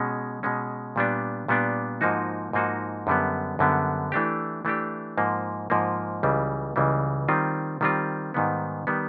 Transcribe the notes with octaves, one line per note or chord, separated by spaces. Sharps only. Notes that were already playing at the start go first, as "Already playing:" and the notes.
Already playing: B2 G#3 C#4
B2 G#3 C#4
A#2 G3 B3 D4
A#2 G3 B3 D4
G#2 F3 A#3 D#4 F#4
G#2 F3 A#3 D#4 F#4
F#2 D3 G3 B3
F#2 D3 G3 B3
E3 A3 D4 G4
E3 A3 D4 G4
G#2 F3 A#3
G#2 F3 A#3
C#2 C#3 E3 G3
C#2 C#3 E3 G3
D#3 G3 C4 F4
D#3 G3 C4 F4
G#2 D#3 G3 B3
D#3 G3 B3